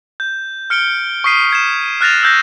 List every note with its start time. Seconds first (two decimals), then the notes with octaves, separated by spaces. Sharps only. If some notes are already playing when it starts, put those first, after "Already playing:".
0.20 G6
0.70 F6 C#7 D7 G7
1.24 C#6 D#6 B6 C7 D#7
1.52 G#6 E7
2.01 F6 F#6 A6 A#6 F7
2.23 E6 G6 A#6